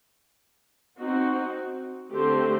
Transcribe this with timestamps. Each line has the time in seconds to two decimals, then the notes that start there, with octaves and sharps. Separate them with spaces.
0.99 C4 D#4 F#4
2.13 D3 A3 C4 G4 C5